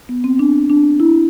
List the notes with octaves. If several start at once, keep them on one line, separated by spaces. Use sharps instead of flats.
B3
C4
D4
D4
E4